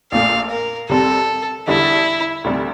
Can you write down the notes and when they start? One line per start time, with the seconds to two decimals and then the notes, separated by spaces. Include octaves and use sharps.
0.12 A#1 A#2 A3 F5
0.50 A#4
0.89 C2 C3 G3 C4 A4
1.67 E2 D3 G3 E4
2.44 D2 C3 G3